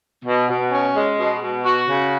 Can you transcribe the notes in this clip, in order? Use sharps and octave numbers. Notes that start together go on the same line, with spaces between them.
B2
B2
C#4
G#3
B2
B2
F#4
C#3